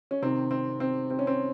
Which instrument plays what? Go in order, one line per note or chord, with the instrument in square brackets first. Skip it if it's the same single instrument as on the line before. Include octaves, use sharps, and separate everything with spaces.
[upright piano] C#4
C3 D#3 C4
C4
C4
C4
C#4
C4